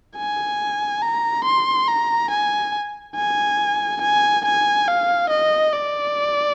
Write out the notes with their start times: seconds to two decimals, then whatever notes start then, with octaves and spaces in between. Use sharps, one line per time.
0.17 G#5
1.02 A#5
1.44 C6
1.88 A#5
2.30 G#5
3.16 G#5
4.01 G#5
4.45 G#5
4.88 F5
5.29 D#5
5.73 D5